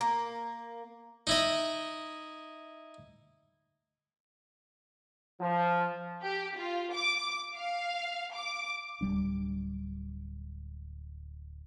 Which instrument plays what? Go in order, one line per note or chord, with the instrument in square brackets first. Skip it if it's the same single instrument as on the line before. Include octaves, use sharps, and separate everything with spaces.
[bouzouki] A#3
[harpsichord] D#4 E4 D#5
[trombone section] F3
[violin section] G4
F4
D6
F5
D6
[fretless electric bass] D1 F2 G3 D4